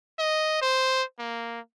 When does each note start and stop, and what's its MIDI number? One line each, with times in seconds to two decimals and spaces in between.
0.19 0.57 75
0.62 1.03 72
1.19 1.60 58